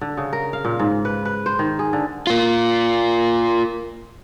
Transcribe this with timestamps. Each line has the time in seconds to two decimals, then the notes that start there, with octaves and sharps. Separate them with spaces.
0.01 D3
0.17 C#3
0.33 A#4
0.53 F5
0.65 A#2
0.79 G#2
1.05 B4
1.25 B4
1.46 C5
1.59 D#3
1.79 G#4
1.93 D3
2.27 A#3 F4